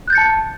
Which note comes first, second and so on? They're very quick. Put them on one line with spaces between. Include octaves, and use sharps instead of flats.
F#6 G6 A6 C#7 A5